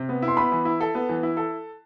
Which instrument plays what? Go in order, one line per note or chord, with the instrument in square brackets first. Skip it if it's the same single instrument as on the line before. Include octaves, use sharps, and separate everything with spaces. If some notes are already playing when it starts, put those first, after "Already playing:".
Already playing: [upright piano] C3
B3
E4
[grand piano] C6
[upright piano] B3 [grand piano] B5
[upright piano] E3
E4
A4
B3
E3
E4
A4